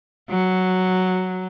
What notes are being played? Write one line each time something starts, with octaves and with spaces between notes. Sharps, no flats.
F#3